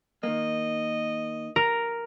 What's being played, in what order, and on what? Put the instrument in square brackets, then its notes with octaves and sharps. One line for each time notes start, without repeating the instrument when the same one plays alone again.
[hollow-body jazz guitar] D#3 A#3 [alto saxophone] D#5
[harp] A#4